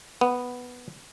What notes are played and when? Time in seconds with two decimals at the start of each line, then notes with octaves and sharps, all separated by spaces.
0.21 B3